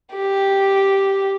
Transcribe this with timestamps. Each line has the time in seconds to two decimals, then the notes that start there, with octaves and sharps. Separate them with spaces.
0.13 G4